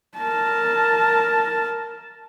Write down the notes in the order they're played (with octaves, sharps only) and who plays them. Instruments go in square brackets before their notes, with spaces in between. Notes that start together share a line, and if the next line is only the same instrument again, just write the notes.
[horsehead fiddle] A#4 A5